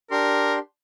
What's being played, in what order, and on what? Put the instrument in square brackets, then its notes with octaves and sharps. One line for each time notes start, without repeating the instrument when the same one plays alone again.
[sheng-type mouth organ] D4 G4 C6 [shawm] A#4